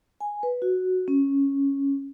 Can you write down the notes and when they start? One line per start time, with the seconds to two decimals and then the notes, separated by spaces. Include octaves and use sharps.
0.20 G#5
0.43 B4
0.62 F#4
1.08 C#4